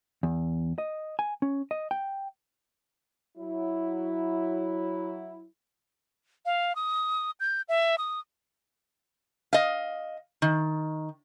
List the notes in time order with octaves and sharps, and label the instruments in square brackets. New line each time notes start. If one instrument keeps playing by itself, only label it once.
[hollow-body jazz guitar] E2
D#5
G#5
C#4
D#5
G5
[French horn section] F#3 E4
[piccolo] F5
D#6
G6
E5
D#6
[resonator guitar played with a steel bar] D#5 F5
D#3